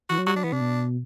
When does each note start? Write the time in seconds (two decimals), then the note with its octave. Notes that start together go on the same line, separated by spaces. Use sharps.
0.09 E3 F#4
0.18 F#3
0.26 G3 F#4
0.35 F#3 D4
0.44 E3 B3
0.52 C3 D4
0.61 B2